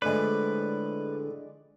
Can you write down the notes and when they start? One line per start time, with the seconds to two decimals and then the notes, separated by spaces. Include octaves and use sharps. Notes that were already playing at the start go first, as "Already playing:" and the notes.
0.02 A2 D3 F3 G#3 D4 B4 D5